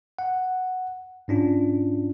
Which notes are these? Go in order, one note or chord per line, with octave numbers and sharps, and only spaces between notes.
F#5
G#2 C#4 D4 F4